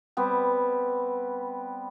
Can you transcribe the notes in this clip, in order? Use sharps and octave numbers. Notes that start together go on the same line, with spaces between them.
G3 B3 C4